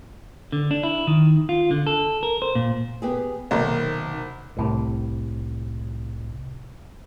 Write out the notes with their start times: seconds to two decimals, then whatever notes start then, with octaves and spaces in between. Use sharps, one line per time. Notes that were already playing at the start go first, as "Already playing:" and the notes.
0.52 D3
0.71 D4
0.83 E4
1.07 D#3
1.49 F4
1.71 D3
1.87 A4
2.23 A#4
2.42 C5
2.55 A#2
3.02 B3 G4 G#4
3.51 B1 C3 D#3 A#3
4.57 C2 A2 C3